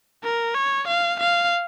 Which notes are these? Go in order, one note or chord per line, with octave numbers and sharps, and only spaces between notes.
A#4
C#5
F5
F5